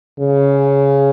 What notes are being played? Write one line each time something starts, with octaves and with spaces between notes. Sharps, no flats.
C#3